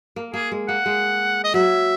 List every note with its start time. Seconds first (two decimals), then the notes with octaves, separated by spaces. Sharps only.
0.16 A#3
0.34 A#3 G#4
0.51 G#3
0.68 A#3 F#5
0.86 G#3
1.44 D#5
1.54 F#3 E5